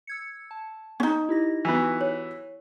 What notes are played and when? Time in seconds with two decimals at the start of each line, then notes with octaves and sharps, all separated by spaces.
0.07 E6 G#6 C#7
0.51 A5
1.00 C#4 D#4
1.29 E4 G4 A#6
1.65 E3 F#3 B3
2.01 C#5